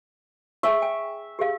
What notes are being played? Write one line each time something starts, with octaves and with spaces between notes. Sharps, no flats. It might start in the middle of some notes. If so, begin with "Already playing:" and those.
G#4 E5 G#5 C#6
G5 G#5
G4 G#4 F5